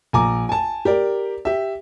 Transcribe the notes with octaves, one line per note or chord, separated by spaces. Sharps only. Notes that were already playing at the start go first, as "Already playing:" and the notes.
A#1 G#5 A#5 D6
G#5 A5
G4 A#4 D5
G4 E5